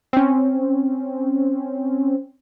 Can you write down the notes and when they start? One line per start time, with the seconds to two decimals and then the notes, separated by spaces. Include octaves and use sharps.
0.13 C4 C#4